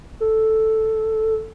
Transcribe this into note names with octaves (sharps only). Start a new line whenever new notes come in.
A4